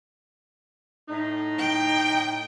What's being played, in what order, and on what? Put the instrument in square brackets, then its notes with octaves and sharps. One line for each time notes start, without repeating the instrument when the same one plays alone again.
[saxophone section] A2 D#4
[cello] G5